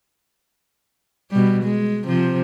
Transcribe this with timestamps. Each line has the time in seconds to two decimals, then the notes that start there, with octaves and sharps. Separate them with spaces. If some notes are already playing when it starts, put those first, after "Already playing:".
1.31 B2 G3
1.63 G#3
2.03 C3 F3